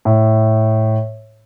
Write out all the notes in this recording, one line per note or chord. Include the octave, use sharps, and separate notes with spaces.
A2